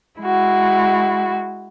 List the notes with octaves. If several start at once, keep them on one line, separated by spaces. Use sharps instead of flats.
G#3 E4 F#4